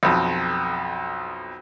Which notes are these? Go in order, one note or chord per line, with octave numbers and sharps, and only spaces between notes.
B1 F2